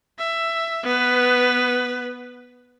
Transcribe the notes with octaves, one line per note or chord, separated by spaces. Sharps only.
E5
B3 B4